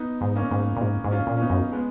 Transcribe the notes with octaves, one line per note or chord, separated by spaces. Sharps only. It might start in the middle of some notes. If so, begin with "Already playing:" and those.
Already playing: B3 D#4
G#2
A#3 C#4
G#2
A#2
G#2
G#2
C#4 F4
A#2
C#4
B3 D#4
F#2
G#3 B3